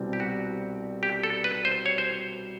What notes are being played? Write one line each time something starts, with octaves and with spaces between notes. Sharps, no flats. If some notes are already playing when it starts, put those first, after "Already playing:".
Already playing: C2 B2 G3 C4 E4
G4
F#4
G4
A4
B4
C5
C#5
C5